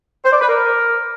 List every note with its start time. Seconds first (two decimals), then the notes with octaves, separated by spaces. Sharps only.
0.25 C5
0.33 D5
0.41 B4
0.48 A#4